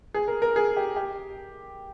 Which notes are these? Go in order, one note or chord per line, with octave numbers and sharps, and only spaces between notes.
G#4
A#4
A#4
G#4
G4
G4